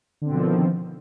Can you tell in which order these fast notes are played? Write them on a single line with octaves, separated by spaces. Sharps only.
D3 C4 B2 F3 D#3